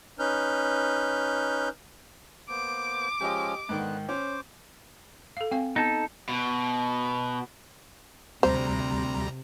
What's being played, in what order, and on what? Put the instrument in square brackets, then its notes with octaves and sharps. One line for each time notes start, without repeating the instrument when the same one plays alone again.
[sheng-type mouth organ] C#4 D#4 B4 F6 G6
[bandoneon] A#3 B3 C5 [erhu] D6
[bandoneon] F3 G#3 C#4 [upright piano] G4 D#5
[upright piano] G#2 D#3 [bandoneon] D3 B3 F#6
[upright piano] C#4 [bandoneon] C5 D6
[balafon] A4 F5
C4 F5 G#5
[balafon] B3 [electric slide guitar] D#4 A4
[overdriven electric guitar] B2
[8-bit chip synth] D2 G3 A#5 [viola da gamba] C3 [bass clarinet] C4 [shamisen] C5